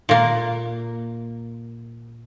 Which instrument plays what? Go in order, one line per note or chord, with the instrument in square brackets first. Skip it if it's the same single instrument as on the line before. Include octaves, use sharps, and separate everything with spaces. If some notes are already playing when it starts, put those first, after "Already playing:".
[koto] A#2 A#3